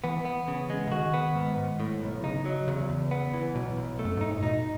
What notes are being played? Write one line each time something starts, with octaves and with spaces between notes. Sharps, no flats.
E3 B3
B3
C#3
G#3
C#3
D#3 F#4
B3
G#2
G#2
A2
B1
C#3 D#4
F#3
E2 C#3
E2
B3
E3
B1 B2
B1
A3
F#2
G#2 D#4
A2
B2 D#4